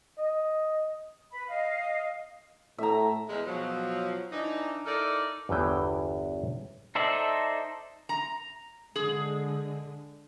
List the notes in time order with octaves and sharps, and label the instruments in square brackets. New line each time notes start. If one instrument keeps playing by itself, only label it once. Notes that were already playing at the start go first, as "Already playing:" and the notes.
[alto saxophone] D#5
[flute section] B4 B5
D#5 F5
[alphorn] A2 [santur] E5 A#5
[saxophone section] E2 G#3
B2 F3 F#3
E3 D4 D#4
D#4 E4 A4 A#4 D5
[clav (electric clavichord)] G1 E2 E3 G5
[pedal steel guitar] D#4 A4 C5 D5 E5
[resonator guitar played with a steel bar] A#5
[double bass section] D3 G#3 [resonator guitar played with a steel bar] G#4